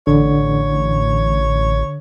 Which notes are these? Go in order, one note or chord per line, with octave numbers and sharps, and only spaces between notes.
A1 D3 C#5